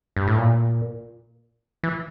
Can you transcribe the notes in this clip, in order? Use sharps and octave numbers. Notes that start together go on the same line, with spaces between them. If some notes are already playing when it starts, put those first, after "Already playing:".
G2
A2
A#2
E3